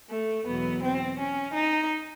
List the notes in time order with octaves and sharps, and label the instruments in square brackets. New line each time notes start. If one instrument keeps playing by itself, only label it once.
[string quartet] A3
E2 B2 F#3 B3
C4
C#4
D#4